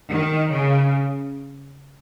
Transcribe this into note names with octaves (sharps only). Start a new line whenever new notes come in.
D#3
C#3